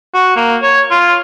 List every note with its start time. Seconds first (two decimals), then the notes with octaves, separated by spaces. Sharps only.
0.14 F#4
0.36 A#3
0.62 C#5
0.91 F4